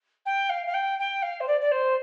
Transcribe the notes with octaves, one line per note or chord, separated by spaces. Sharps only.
G5
F5
F5
G5
G5
F5
C5
D5
D5
C5